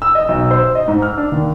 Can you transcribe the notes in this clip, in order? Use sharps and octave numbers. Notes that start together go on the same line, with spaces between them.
E6
D#5
B1
C5
D#5
G#2
F6
D4
D#2